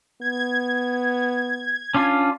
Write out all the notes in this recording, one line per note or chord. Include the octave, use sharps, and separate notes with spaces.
B3 G#6
C#4 D4 F4